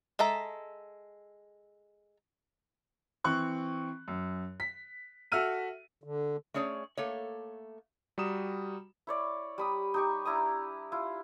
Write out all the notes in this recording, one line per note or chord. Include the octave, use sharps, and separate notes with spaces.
G#3 A4 E5 A#5
E3 C4 C#6 F#6
F#2
B6
F#4 A4 E5 E6 F6 D#7
D3
A3 C#4 G#4 C#5 D5
A3 A#3 C#5
G3 F#4 A#5 D#6 E7
E4 C#5 D5
G3 B5 D#6
D#4 G4 C#6
D4 E4 A#5 D#6
E4 F4